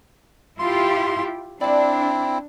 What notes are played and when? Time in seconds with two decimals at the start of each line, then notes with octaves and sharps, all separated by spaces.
0.59 E4 F4 G4 C6
1.61 C4 D4 E4 D5 A5